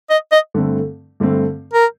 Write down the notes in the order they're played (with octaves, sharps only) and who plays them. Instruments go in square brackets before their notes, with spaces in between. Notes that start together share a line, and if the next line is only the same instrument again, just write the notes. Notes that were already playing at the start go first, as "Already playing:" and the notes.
[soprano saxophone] D#5
D#5
[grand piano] G2 D3 A3 C4
G2 D3 A3 C4
[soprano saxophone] A#4